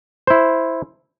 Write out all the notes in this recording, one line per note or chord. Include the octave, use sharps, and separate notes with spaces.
E4 C5